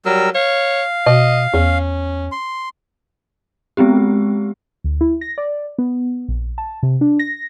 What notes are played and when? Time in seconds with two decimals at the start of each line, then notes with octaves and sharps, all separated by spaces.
0.06 F#3 G3 A#4 E6
0.35 C#5 F5
1.06 B2 D#5
1.54 E2 C#4
2.32 C6
3.77 G#3 B3 C4 G4
4.84 D2
5.01 E4
5.21 A#6
5.38 D5
5.78 B3
6.29 A#1
6.58 A5
6.83 C3
7.01 D4
7.19 A#6